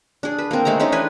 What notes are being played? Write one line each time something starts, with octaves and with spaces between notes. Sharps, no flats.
D4 G#4
B4
A#3 C4
G#3 A3 G#4 A#5
G#3 A3 C#4 D#4
E3 D4 B4 G#5